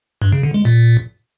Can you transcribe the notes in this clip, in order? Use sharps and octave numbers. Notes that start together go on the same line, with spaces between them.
G2
C#3
D3
G#3
A#2